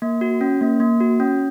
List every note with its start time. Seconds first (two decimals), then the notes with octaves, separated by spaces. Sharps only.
0.02 A#3
0.21 F#4
0.41 C#4
0.61 A#3
0.80 A#3
1.00 F#4
1.20 C#4